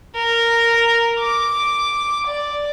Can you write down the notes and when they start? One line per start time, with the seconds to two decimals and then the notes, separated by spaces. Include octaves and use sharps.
0.15 A#4
1.19 D6
2.27 D5